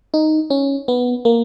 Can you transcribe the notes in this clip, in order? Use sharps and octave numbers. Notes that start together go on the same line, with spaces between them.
D#4
C#4
B3
A#3